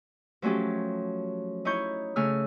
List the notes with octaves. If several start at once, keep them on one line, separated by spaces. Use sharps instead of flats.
F3 F#3 A3 C#4 G4
D#4 E4 C#5 C#6 G6
C#3 A3 G#5 E6 F6